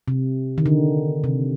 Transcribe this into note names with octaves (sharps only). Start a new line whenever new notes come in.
C3
D#3
D3
C3